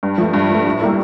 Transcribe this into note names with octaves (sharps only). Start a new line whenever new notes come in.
G2
F3 A3
G2
F3 A3
A2
G3 A#3 E4 A4